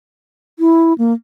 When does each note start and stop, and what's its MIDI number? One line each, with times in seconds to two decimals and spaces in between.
0.59 0.93 64
0.98 1.13 58